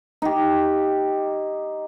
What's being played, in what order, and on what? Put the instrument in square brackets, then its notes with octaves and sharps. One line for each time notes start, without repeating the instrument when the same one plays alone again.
[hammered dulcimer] D#4 G4